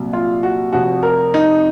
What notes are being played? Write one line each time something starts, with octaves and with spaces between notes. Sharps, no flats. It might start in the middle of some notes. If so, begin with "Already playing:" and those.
Already playing: C2 A#2 F#3
F4
F#4
F1 F2 C3 F3 F#4
A#4
D#4